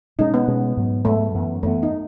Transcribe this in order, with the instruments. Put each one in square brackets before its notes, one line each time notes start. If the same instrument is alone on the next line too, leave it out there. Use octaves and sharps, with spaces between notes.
[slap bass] B2 G#3 C#4 [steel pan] D#4
[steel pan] B3
[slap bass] B2 G#3 C#4
G#2 F#3 B3
[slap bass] G#2 F#3 B3 [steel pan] A3
[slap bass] F#2 E3 B3
[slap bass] F#2 E3 B3 [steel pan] A3
[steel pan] D#4